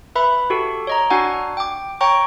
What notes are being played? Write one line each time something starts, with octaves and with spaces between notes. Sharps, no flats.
B4 E5 B5
F#4 G4 A4
C#5 D#5 A#5
D4 F#4 F#5 G#5
G5 D6
C#5 G5 A#5 C#6